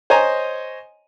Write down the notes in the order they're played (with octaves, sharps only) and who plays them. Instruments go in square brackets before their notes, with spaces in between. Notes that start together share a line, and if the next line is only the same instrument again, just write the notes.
[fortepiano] C5 C#5 D#5 G#5 A#5